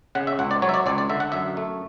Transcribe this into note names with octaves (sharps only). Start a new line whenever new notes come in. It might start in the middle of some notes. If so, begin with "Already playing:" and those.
C#3 F#5
E5
C#2 F#5
D5
F#3 C#5
E5
D5
C#2 D5
D5
D3 E5
F#5
F#2 E5
A3